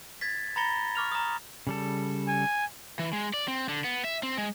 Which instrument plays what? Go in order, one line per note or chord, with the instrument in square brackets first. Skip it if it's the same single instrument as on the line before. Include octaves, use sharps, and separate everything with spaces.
[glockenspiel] G#6 A6 B6
A#5 B5 A6 A#6 C#7 G7
C#6 D6 F6 F7
A#5 D#6
[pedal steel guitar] C#3 G3 A4
[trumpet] G#5
[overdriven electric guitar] E3
G#3
D5
C4
D3
B3
E5
C4
G#3